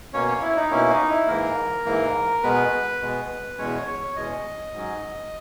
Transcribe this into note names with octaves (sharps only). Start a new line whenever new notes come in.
B2 A#3 C#4 C#5
C#5
E4
D#4
B2 A#3 C#4 E4
D#4
E4
G#2 E3 A#3 A#4
G#2 E3 A#3
B2 G#3 B3 B4
B2 G#3 B3
E2 B2 G#3 C#4 C#5
C#5
E2 B2 G#3 C#4 D#5
G#2 F#3 C#4